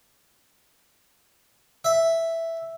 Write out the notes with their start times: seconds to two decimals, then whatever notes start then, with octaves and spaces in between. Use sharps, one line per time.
1.84 E5